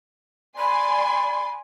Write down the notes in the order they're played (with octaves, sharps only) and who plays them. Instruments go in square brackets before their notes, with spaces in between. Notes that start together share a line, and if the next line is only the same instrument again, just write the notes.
[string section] D5 G#5 C6 [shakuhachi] B5